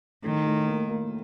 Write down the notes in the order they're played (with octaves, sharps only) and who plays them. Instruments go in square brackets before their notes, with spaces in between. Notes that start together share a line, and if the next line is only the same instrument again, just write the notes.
[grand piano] A2 [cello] D#3
[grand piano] A2
A#3
A#3